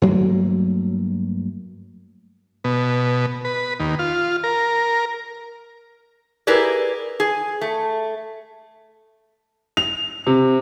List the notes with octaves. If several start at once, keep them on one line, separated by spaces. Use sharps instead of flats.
G2 F#3 A3 A#3
B2
B4
D#2
F4
A#4
E4 G4 G#4 A#4 B4 D5
G#4
A3
F7
C3